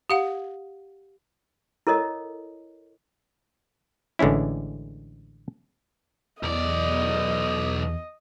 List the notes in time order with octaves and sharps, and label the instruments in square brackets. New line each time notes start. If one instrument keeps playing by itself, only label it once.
[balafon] G4 F5 F#5
[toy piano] E4 A4 A#4 C#5 D#5
[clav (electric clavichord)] A1 D3 G#3 C#4 E4
[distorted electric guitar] B1 D5 [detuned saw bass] E2 [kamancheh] D#5